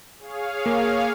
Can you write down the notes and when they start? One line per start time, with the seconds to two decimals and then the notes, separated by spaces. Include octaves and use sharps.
0.18 G#4 C#5 F5
0.66 A#3